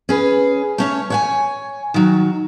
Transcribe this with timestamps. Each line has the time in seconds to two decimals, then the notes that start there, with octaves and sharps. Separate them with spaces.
0.09 C#4 G#4 B4
0.78 A3 C#4 C#5
1.10 C#5 F#5 G#5
1.94 D#3 F#3